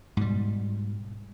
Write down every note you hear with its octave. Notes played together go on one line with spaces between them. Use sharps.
G#2 B2 G3